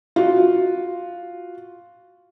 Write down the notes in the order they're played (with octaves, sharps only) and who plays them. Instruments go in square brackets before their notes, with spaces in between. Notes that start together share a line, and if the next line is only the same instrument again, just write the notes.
[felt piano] F4 F#4